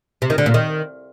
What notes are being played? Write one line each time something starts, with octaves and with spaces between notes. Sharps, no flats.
C3
D#3
D3
A#2
D#3